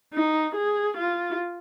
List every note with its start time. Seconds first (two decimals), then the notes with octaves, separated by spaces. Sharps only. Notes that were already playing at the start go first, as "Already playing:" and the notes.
0.13 D#4
0.55 G#4
0.97 F4